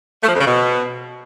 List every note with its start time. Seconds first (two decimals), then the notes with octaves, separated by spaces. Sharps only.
0.22 A3
0.28 F3
0.34 F2
0.40 C#3
0.46 B2